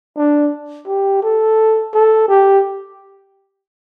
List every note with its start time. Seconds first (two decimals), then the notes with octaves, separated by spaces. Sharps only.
0.17 D4
0.88 G4
1.23 A4
1.94 A4
2.29 G4